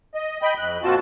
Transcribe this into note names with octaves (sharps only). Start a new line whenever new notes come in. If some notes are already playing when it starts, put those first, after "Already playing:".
D#5
D#5 G5 B5
F2 F#6
A#2 C4 F4 F#4 A5